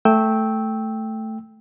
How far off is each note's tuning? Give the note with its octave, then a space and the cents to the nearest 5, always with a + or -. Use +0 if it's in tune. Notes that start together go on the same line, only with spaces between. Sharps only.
A3 +0 G5 +0 E6 -15